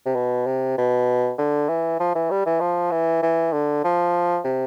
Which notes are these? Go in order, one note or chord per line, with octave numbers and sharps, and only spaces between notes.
C3
B2
C3
B2
D3
E3
F3
E3
G3
E3
F3
E3
E3
D3
F3
C3